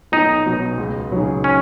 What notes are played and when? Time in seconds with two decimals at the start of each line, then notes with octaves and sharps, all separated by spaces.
0.12 B1 D#4
0.46 B2 F#3
0.78 C#2
1.11 C#3 F#3 D#4 G#4
1.44 C#4